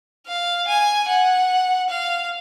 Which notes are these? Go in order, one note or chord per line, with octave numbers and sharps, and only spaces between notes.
F5
G#5
F#5
F5